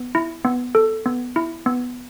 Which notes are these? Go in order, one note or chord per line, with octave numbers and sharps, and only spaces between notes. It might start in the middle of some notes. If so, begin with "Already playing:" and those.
Already playing: B3
E4
B3
A4
B3
E4
B3